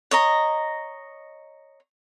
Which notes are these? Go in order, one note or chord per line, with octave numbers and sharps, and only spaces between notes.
C#5 D#5 A#5